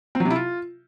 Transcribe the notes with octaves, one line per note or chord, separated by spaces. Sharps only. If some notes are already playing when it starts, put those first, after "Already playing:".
C4
F#3
C3
E4
F4